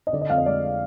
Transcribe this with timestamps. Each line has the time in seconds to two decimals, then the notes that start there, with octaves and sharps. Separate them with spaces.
0.07 D#5
0.13 D3 D5
0.21 D#5
0.30 F2 F5
0.38 D#5
0.46 G#3 D5